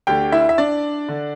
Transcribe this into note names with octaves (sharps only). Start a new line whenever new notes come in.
D2 D3 G4 G5
E4 E5
E5
D4 D5
D3